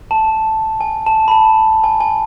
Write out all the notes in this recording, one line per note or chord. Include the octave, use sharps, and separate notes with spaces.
A5
G#5
A5
B5
A5
G#5
G#5